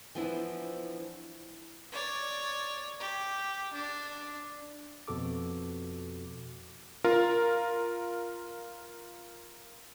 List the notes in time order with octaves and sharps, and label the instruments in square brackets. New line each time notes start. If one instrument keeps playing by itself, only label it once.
[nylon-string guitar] E3 F3 B3 D4 E4
[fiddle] C#5 D5
G4
D4
[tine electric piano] F2 B2 F#4 A4 D6
[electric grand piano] F4 A#4